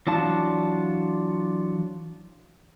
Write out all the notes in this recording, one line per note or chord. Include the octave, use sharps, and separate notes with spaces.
E3 F#3 D4 F4 A5